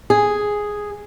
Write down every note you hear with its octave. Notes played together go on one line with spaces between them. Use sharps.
G#4